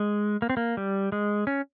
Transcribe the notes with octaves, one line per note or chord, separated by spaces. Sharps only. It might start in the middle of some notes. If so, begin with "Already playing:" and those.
Already playing: G#3
A#3
C4
A#3
G3
G#3
C#4